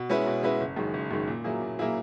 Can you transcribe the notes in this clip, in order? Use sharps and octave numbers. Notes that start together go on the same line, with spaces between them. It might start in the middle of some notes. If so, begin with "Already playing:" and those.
Already playing: B2
G#3 C#4 E4 B4
B2
G#3 C#4 E4 B4
F#1
F#2 D#3 G#3
F#1
F#2 D#3 G#3
A#2
F#3 A#3 E4 G#4
A#2
F#3 A#3 E4 G#4